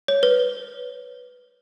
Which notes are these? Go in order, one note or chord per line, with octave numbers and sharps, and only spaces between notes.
C#5
B4